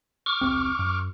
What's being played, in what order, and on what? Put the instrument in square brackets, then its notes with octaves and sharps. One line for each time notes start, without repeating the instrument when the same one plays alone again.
[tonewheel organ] C#6 D6 F6
[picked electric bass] E1 C2 C4
F#2